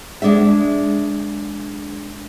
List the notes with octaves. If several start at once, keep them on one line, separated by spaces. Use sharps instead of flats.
G#3 D4 G#4 E5